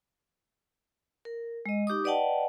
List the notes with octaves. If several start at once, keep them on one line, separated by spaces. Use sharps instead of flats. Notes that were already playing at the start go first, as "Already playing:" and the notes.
A#4
G#3 D#5
D#4 G4 D6 D#6
B4 D5 D#5 F#5 G5 A5